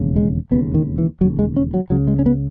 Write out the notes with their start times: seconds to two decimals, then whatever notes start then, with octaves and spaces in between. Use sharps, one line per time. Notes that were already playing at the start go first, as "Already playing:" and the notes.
Already playing: E1 D#2 C#3
0.16 G#3
0.51 E1 D#2 C#3 B3
0.74 D#3
0.98 E3
1.21 E1 D#2 C#3 F#3
1.39 G#3
1.56 C#4
1.74 F#3
1.90 C#2 C#3 F#3
2.08 G#3
2.19 C#4
2.26 B3